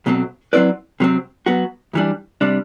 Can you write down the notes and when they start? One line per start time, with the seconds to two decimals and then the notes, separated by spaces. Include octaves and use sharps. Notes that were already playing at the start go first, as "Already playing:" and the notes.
0.06 B1 B2 F#3 C4
0.53 F#3 C4 E4 B4 D5
1.00 C3 F#3 C4
1.46 F#3 B3 F#4
1.93 F#2 E3 G3 D4
2.41 C3 G3 D4